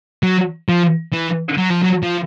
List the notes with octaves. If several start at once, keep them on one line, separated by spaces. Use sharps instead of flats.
F#3
F3
E3
F#3
F3
F#3
F3